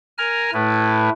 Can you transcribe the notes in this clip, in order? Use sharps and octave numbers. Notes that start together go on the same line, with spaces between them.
A#4 G#5 A#5 F6
A2 A3 E4 B4